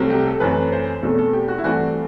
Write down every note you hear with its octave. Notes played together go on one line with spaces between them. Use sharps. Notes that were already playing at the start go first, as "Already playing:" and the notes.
Already playing: C2 C3 F#3 A3 C4
G4
A4
F#2 E3 A3 C4 B4
C5
E2 B2 F#3 A3 C4 A4
A4
G4
F#4
E4
G2 E3 A3 C4 F#4